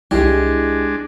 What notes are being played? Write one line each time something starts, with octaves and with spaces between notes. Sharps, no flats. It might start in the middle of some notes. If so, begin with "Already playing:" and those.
C2 G#3 D4 E4 G4 G#4 D#5